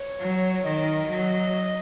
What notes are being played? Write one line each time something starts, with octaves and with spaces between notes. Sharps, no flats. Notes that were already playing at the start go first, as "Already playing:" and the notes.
Already playing: C#5
F#3
D#3 D#5
F#3